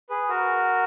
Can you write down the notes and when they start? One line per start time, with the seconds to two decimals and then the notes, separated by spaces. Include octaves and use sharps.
0.09 G#4 B4
0.29 F#4 A#4